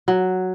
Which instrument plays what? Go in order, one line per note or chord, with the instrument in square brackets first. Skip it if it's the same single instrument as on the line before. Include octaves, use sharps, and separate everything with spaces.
[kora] F#3